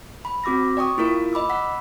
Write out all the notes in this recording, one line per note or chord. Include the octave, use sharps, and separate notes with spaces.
B5
C4 F#4 D6 E6 A#6
D5 G5 C#6 D#6
A#3 E4 F4 A#4 D7
D#5 B5 D6 E6
F#5 B5 E6 B6